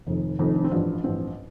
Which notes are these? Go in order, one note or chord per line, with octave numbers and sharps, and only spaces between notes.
F1 F2 D#3 D#4
F1 F2 D#3 D#4
D4
C4
A1 G2 F3 D4
A1 G2 F3 C4